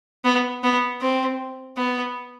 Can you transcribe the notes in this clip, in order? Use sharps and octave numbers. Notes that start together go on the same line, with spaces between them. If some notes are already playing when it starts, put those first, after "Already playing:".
B3
B3
C4
B3